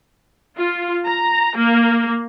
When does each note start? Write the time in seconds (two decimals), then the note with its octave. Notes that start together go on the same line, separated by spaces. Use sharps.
0.58 F4
1.05 A#5
1.56 A#3